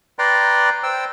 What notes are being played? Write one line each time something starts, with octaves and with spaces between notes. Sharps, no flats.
B4 D5 G5 A#5 C6
C5 G5 E6